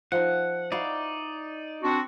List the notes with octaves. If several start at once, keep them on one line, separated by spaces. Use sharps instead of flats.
F3 D#4 F#5
D#4 E4 F#4 D5 F5
C4 D4 F#4